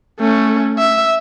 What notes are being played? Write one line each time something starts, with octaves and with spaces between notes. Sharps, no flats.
A3 C#4
E5